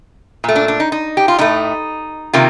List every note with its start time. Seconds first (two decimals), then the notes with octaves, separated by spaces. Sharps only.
0.44 A#2 A3
0.56 D4
0.68 D4
0.80 D#4
0.92 D#4
1.17 G4
1.28 F4
1.38 A2 A3 D#4
2.33 C3 D#3 A#3 F4